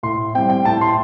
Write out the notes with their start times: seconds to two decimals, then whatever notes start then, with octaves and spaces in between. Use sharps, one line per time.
0.03 A2 C6
0.35 G3 C4 G5
0.50 G5
0.65 A2 A5
0.81 C6